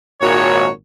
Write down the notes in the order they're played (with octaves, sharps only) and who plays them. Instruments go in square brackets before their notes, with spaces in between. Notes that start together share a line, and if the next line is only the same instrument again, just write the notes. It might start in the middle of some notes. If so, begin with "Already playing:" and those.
[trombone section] G#1 A#2 [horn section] F#4 A#4 C#5